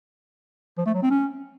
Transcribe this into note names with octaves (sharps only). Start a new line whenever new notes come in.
F3
A3
F#3
C4
C#4